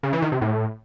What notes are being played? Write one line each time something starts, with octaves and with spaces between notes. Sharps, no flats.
C#3
E3
D#3
C3
A2